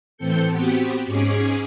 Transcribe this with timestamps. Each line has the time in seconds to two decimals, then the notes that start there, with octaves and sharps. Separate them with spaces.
0.17 A2 E3 C4 A4 G6 C#7
0.50 B3 C4 F#4 G4
1.06 G#2 C#4 G#4 C#6 D6